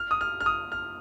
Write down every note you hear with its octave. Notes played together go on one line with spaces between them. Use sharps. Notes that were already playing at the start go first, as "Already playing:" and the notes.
Already playing: F6
D#6
F6
F6
D#6
F6